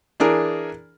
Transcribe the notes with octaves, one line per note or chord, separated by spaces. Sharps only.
E3 D4 G#4 A#4